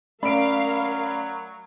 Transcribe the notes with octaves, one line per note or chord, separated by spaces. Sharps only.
F#3 A3 C#4 A#4 D5 F5 B5 D7